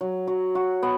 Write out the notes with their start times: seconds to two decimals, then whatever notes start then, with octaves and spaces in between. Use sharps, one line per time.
0.01 F#3
0.27 F#3
0.55 F#4
0.83 B3